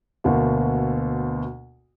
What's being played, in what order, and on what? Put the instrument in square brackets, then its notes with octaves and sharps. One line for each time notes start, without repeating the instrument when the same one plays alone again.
[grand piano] D2 B2 A#3